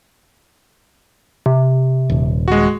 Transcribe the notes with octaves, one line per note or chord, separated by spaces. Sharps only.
C3
D#1
G#3 F#4